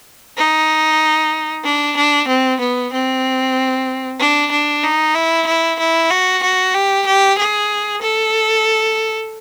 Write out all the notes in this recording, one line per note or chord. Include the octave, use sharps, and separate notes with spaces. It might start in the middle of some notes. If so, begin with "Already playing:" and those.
D#4
D4
D4
C4
B3
C4
D4
D4
D#4
E4
E4
E4
F#4
F#4
G4
G4
G#4
A4